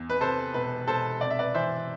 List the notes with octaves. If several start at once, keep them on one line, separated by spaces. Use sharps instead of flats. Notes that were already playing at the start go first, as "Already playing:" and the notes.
Already playing: E2
B4
C3 A4 C5
E1 B4
E1 A4 C5
C3 D5
E5
B4 D5
E3 C5 E5